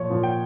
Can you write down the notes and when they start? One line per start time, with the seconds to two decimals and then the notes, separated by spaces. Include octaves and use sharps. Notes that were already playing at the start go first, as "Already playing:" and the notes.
Already playing: A#2 F3 C#5
0.10 A#2 F3
0.23 G5